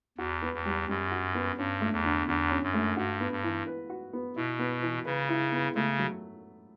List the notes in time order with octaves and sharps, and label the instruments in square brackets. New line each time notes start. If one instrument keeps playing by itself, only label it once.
[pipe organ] E2 [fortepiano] F#4
[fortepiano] B3
[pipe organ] E2
[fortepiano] G3
[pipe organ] F#2 [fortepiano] G3
[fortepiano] F#4
B3
[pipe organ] G2 [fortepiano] C#4
[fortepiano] A3
[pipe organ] E2
[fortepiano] D3
[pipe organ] E2 [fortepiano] D3
[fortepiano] C#4
[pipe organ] F#2
[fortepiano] A3
[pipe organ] G2 [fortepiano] F#4
[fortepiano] B3
[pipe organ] G2
[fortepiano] E3
B4
F#4
B3
[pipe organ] B2 [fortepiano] E4
[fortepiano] B3
E3
[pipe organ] C#3 [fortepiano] B4
[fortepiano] E4
B3
[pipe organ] C#3 [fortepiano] A3
[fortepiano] F#3